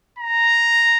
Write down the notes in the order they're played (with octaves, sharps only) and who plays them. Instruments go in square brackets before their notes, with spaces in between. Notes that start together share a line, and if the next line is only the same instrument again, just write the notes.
[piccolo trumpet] A#5